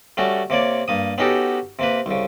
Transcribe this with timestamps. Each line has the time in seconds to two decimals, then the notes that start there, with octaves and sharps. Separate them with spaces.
0.17 G3 A3 C#4 F#4
0.50 C3 A#3 C#5 D5
0.88 G2 A#3 D#6
1.18 B3 C#4 D#4 F#4 G4 A4
1.79 C3 A#3 B4
2.06 C2 C#3